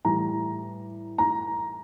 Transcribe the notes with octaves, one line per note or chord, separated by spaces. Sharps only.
A2 E3 G3 A#5
A#5